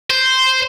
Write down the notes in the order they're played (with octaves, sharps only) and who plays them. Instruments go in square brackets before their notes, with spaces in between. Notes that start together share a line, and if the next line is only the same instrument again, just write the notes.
[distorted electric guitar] C5